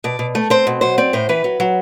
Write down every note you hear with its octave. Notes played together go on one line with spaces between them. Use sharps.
B2 D5
B2
A3
C4 C5
B2
F#3 C5
C4 D5
A2 C5
E3 B4
F#3
F#3